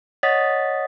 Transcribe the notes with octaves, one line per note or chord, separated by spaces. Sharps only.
C#5 D#5 F#5 D#6 A6 B6